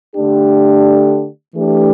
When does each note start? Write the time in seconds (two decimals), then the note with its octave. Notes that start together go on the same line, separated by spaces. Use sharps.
0.15 D3 A3 D4 G4
1.56 E3 A3 D4 G4